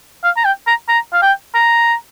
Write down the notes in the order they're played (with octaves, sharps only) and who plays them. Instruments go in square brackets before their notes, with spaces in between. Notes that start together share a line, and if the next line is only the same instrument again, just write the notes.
[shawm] F5
A#5
G5
A#5
A#5
F5
G5
A#5